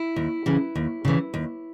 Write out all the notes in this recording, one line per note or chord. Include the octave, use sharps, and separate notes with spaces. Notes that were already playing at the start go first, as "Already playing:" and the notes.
Already playing: E4
D#2
C#3 E3
D#2
C#3 E3
D#2